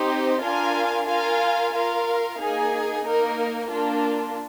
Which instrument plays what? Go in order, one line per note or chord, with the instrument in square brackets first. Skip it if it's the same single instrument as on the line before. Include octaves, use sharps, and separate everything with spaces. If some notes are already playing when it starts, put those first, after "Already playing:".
Already playing: [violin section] C4 D#4 G4 C5
D4 F4 A#4 F5 G#5
F4 A#4 F5 G#5
F4 A#4 F5
A#3 D#4 G#4
A#3 D#4 A#4
A#3 D4 F4